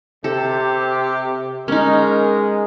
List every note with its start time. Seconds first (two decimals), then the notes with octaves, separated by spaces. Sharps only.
0.24 C3 G4 A4
1.68 G#3 C#4 D#4 A#4